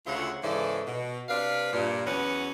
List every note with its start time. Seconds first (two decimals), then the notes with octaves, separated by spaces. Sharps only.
0.06 D2 C#3 F4 E5 F#5
0.43 G#2 C#3 E3 A4 D5
0.86 B2
1.29 C3 D4 B4 F5
1.73 G2 A#2
2.06 E2 F#3 C#4 B4 F#5